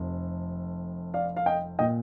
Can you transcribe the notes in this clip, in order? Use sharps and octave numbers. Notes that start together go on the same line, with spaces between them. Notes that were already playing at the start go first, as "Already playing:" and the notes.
Already playing: F1 F2
D5 F5
F5
D#5 G5
A#2 D#5 G5